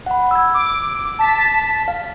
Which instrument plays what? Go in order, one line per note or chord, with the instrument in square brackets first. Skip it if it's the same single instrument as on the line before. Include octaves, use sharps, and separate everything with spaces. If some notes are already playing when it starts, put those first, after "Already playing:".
[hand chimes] F#5 B5
E6 G#6
[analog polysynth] D6
A5 B6
[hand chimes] F5